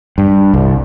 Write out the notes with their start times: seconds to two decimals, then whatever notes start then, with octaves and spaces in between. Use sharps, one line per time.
0.18 G2
0.54 C2